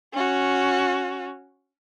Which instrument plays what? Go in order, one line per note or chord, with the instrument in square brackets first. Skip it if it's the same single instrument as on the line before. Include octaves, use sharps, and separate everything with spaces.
[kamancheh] C#4 F#4